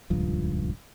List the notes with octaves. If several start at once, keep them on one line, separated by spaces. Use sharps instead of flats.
D#1 C#2 G2 F3